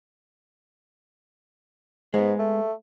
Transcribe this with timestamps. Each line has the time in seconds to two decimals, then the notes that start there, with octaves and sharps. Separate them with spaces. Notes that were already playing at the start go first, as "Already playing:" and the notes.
2.14 G#2 G#3 B3
2.39 A3